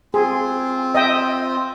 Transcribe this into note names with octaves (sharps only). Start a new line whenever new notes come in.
C4 F4 G#4
D#5 E5 G5